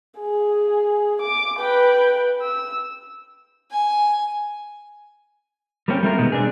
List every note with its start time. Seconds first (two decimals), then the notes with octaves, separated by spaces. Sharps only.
0.19 G#4
1.21 D6
1.59 B4 G5
2.42 E6
3.71 G#5
5.88 G3 A#3 C4 C#4 F#4 G4
6.03 G3 A3 F4 A#4
6.18 B2 D#3 G#3 B3
6.32 C4 D4 G#4